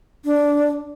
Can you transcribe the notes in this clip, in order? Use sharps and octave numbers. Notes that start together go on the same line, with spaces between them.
D4